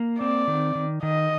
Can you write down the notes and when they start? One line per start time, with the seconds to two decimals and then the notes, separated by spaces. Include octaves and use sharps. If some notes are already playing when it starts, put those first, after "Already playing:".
Already playing: A#3
0.20 C4 D5
0.47 D#3
0.75 D#3
1.03 D#3 D#5